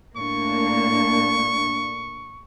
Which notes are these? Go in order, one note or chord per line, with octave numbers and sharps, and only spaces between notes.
A2 A#3 D4 C#6